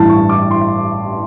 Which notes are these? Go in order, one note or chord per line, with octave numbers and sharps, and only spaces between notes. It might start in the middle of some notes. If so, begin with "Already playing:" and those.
Already playing: A1 G2 E3 A5
C#6
D6
C6